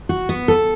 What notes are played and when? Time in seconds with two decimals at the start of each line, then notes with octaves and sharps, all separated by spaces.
0.09 F#4
0.29 B3
0.48 A4